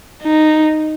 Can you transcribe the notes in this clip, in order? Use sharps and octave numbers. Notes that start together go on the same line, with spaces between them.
D#4